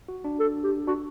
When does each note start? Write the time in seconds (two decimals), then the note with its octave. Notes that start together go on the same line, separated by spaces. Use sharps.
0.08 F#4
0.24 D4
0.40 A4
0.64 G4
0.87 D4 F#4